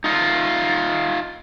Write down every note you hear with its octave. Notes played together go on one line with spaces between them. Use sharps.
D#4 F4